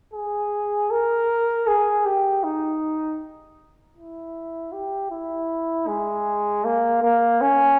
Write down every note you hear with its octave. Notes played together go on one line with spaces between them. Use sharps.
G#4
A#4
G#4
G4
D#4
E4
G4
E4
G#3
A#3
A#3
C#4